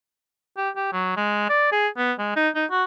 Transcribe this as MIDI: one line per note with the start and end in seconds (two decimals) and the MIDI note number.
0.57 0.70 67
0.76 0.89 67
0.93 1.14 54
1.17 1.48 56
1.49 1.72 74
1.72 1.88 68
1.97 2.13 59
2.19 2.35 56
2.36 2.49 63
2.55 2.65 63
2.71 2.84 66